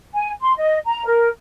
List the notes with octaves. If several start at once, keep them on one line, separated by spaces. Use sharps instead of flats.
G#5
C6
D#5
A#5
A#4